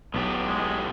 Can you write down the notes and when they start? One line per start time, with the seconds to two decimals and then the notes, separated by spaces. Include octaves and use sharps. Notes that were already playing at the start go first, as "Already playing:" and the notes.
0.14 B1 A2 B3 G4
0.46 G#3